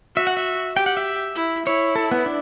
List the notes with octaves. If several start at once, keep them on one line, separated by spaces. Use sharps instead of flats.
F#4 E5
F#5
E5
G4 G5
F#5
E5
E4
E4 C#5
A4
B3
D4